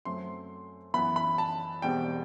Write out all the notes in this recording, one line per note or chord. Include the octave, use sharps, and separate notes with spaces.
F#2 F#3 A3 C4 C6
F#2 E3 B3 B5
B5
A5
E1 E2 B2 G3 C4 G5